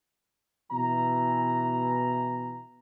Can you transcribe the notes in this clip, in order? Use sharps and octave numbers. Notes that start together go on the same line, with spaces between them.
B2 E3 A#5